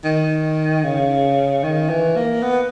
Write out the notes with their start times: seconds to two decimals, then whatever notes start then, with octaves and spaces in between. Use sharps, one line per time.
0.04 D#3
0.84 C#3
1.63 D#3
1.89 E3
2.16 A#3
2.42 B3